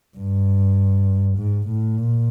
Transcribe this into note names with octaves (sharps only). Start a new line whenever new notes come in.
G2
G#2
A2
A#2